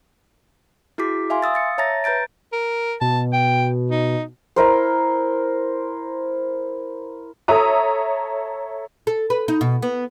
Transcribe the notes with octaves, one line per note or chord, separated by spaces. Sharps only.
E4 F#4 G#4 D6 B6
E5 F5 G#5 C6
F5 D#6 E6 A6
E6 A6 C#7
C#5 E5 A5 A#5 A6 A#6
B4 A#5 G6 A6 D7
A#4
B2 A5
G5
D#4
E4 A#4 C5
A4 C#5 E5 A#5 D#6
A4
B4
D#4
B2
B3